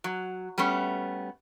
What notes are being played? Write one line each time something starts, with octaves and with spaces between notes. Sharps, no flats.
F#3
G3 A3 B3 C#4